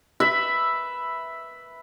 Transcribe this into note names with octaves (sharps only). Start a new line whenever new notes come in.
B4 E5 B5